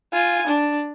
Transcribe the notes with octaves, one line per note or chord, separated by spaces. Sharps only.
F4 G#5
D4